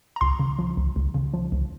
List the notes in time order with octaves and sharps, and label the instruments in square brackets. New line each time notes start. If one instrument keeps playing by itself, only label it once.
[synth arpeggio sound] A#5
C#2 C6
C#3
F3
C#2
C#2
C#3
F3
C#2